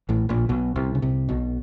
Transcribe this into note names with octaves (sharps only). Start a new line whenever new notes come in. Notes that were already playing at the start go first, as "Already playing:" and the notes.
A1 A2
A#1 A#2
B1 B2
C2 C3
C#3
C2 C3
B1 B2